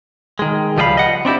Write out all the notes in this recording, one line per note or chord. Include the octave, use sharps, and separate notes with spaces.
D#3 G#3
C#2 F3 G3 D#5 F5 B5
D#5 F#5
C4 D4 E4 G4